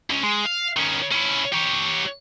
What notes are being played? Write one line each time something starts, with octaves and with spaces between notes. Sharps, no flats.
C#2 C#4
G#3
F5
D#3 C#4
C#4 E4
G4 C#5